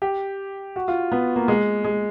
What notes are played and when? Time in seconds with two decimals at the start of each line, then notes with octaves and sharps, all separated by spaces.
0.02 G4
0.76 F#4
0.88 F4
1.12 B3
1.36 A#3
1.48 G#3
1.84 G#3